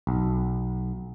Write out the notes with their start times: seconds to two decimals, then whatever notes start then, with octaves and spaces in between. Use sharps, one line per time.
0.07 B1